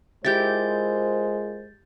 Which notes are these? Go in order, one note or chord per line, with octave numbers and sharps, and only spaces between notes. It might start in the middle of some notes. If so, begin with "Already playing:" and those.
G#3 E4 F4 G4 A#4 C5 G6 A6